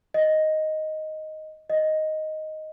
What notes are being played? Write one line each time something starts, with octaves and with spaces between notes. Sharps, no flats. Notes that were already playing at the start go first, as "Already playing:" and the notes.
D#5
D#5